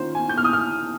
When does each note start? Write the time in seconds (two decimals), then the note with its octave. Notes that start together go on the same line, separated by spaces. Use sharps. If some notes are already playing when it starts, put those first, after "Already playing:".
Already playing: D#3 A#3 C#4 F4 C5
0.15 G#5
0.29 G6
0.38 F6
0.44 D#6
0.53 F6